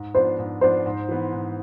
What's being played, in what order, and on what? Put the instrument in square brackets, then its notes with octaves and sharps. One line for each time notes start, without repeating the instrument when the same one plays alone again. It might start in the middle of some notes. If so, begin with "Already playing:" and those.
Already playing: [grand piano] G#2
[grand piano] F3 B3 D4 [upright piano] C5
[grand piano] G#2
[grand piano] F3 B3 D4 [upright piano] C5
[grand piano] G#2
E3 B3
G#2